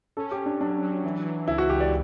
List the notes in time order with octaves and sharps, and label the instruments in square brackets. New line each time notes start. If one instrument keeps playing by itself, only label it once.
[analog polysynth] C#4 [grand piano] A4
[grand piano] G4
[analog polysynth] C#4
[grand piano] D4
[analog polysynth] F#3 [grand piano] D4
[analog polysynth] F#3
E3
E3
[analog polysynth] C#2 [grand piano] E4
[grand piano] F#4
[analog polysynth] C#2 [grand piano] G4
[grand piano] D5